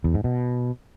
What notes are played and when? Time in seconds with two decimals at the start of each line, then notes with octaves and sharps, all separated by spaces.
0.04 E2
0.14 G#2
0.24 B2